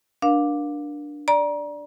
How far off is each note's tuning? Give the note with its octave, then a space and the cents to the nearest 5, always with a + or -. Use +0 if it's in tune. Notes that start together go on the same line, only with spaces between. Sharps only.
D4 +0 A#4 +30 F5 +25
D5 +0 A#5 +30